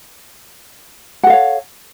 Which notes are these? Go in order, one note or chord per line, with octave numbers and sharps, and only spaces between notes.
A4 C#5 F5 F#5